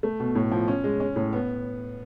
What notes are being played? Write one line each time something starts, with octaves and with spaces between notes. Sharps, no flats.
A3
B2
A2
F3
C#4
G#3
C#4
A2
B3